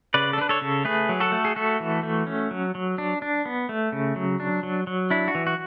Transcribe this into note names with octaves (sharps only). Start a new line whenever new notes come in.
C#3 B4 D5
A4
D4 B4
A4 C#5
C#3
A3 G#4 B4
F#3
F#4 A4
A3
G#4
A3 F#4 A4
E3
A3
C#4
F#3
F#3
D4
D4
B3
A3
C#3
F#3
D4
F#3
F#3
D4 E4
F#4
E3
F#4